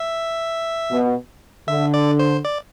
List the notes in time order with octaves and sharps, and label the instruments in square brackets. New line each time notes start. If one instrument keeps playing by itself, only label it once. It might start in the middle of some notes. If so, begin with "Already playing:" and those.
Already playing: [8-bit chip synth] E5
[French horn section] B2
[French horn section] D3 [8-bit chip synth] E5
[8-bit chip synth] D5
C5
D5